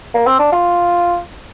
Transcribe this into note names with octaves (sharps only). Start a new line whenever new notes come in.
A#3
C4
D4
F4